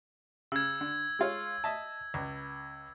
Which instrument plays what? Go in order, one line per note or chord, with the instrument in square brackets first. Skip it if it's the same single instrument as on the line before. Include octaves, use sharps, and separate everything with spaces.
[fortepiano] C#3 [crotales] E6 G#6
[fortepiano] D3
G#3 F4 C#5
D#5 E5 A5
C#2